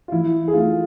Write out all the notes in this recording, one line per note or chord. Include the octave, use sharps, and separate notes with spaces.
F4
E3 E4
G#4
A3 E4 F4